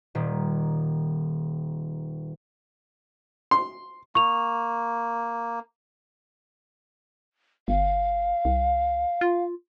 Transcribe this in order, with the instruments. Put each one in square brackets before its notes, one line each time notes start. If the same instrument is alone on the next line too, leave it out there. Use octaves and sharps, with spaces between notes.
[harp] D#1 D#3
[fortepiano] C6
[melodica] A#3 [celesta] C#6 F7
[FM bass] G1 [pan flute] F5
[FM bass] C2
F4